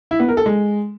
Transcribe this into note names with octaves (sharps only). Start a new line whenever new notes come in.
E4
B3
A#4
A4
G#3